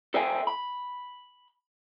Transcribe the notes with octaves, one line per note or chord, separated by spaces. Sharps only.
A4 C5 D#5 E5 G5 G#5
B5